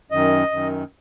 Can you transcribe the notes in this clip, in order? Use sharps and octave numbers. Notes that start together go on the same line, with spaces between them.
F#2 D#3 D#5
F#2 D#3